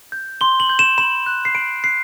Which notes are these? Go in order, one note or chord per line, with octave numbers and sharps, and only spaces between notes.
G6
C6 G7
F#7
G6
E7
B5 E7
F#6
C7
B5 D7
F#6 C7